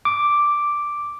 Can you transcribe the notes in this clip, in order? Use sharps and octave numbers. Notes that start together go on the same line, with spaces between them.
D6